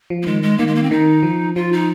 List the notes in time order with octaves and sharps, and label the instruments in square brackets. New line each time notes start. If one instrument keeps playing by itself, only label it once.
[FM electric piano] F3
[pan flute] A#3
[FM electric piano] D#3 [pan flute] G#3
[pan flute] G#3
[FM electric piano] D#3 [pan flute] A#3
[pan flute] G#3
A#3
C4
[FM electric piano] D#3 [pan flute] D#4
[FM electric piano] F3
[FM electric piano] F3 [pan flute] F4
[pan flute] D#4